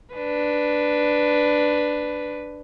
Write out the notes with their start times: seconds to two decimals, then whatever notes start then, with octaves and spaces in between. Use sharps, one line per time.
0.14 D4 B4